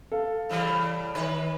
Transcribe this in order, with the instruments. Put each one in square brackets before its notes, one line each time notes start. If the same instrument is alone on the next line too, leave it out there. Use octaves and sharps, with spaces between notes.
[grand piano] A4 F5
[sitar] C#3 E3 G3
D#3 B4 C#5